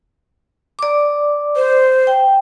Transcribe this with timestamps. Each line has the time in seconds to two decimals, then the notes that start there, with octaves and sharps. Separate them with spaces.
0.79 D5 D6
1.56 C5
2.07 G5